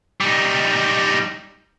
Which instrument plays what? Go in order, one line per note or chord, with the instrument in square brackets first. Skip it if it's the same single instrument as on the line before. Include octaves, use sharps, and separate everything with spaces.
[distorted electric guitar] G3 D#4